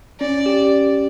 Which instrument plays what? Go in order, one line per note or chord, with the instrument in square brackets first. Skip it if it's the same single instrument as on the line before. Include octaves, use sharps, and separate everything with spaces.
[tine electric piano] C#4 [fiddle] D5
[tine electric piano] G4